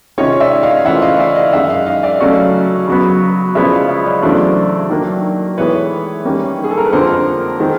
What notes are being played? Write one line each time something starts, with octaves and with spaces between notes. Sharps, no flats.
C3 D#3 G#3 C#4 F4 C#5 D#5
D5 E5
D#5 F5
C#3 E3 A3 C4 F4 E5 F#5
D#5 F5
D5 E5
D#5 F5
F#2 D#3 G#3 E5 F#5
D#5 F5
D#5 F5
D5 E5
C#3 F#3 A3 C#4 F#4 C#5 D#5
C#3 F#3 B3
C#3 F3 G#3 B3 E4 D5 E5
D#5 F5
D5 E5
C#5 D#5
E2 C#3 F#3 A3 D4 C5 D5
D#3 F#3 A#3 D4
A2 E3 G#3 B3 B4 C#5
D#3 G3 A#3 C#4
G#4
A4
A#4
B4
F2 D3 F3 A#3 A#4 C5
D#3 G#3 C4